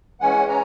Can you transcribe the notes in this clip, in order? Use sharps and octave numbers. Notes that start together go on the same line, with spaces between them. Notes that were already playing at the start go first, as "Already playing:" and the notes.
E3 G#3 C#4 F#5 G#5
G#5 A#5